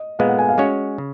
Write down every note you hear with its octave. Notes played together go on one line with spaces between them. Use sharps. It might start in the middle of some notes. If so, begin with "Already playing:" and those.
Already playing: D#5
A#2 G#3 B3 F5
F#5
G#5
F5
G#3 C#4 F#4 C#5
C#3